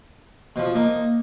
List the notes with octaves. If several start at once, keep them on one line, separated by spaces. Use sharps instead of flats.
B2 F3
A#3 D#4